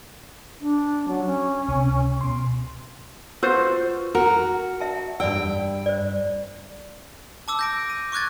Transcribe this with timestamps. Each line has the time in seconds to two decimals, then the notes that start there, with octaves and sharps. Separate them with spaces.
0.61 D4
1.08 F#3
1.26 C#4
1.69 C#2 C3
2.21 B2 C6
3.43 F4 F#4 B4 C5 E6
4.15 F#4 A#4
4.81 E5 A5
5.20 G2 D5 G5 E6
5.86 C5 D5
7.48 A5 D6 E6
7.59 G6 A#6 D7
7.90 D#7
8.12 C#6 D6 F#6 G#6 A6